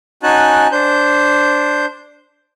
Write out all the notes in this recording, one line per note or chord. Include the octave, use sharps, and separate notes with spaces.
C#4 D#4 F#4 G#5 A5 F#6
D4 C5 G6